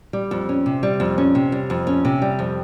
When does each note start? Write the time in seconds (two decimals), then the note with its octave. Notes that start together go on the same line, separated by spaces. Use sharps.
0.13 G3
0.31 F2
0.49 C#4
0.66 C3
0.83 G3
1.00 F2
1.18 C#4
1.35 C3
1.52 G3
1.70 F2
1.87 C#4
2.05 C3
2.22 G3
2.39 F2